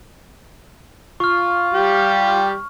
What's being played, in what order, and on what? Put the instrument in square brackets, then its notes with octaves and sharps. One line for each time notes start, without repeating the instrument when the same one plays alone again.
[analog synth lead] F4 [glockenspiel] C#6 F6
[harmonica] G3 G4